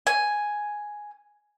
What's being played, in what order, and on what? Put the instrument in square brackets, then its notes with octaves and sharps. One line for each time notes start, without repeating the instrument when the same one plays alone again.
[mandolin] G#5